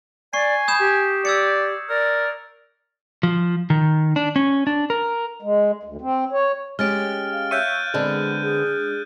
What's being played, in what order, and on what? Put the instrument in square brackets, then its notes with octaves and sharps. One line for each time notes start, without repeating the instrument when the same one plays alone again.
[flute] D5 [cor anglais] G#5 [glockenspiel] C#6 C7
[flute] B5 [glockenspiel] D#6 G6 E7
[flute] G4
[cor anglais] D5 [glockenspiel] E6 G#6 C#7
[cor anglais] A#4 [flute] D5
[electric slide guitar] F3
D#3
D4
C#4
D4
A#4
[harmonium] G#3
D2
C4
C#5
[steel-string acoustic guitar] G#3 C#4 G4 [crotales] F6 A6 D7
[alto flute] F5
[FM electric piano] C#5 E5 C#6 [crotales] F#6 G6 D#7
[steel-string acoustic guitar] D3 B3 C4 [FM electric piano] G#3 D4 [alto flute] G#4
[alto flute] G#4